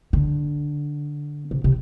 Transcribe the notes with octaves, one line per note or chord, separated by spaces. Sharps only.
D3
C3
C3